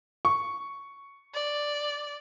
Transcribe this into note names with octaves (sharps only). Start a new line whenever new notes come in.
C#6
D5